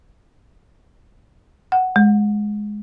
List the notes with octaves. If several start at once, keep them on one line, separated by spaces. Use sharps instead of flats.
F#5
G#3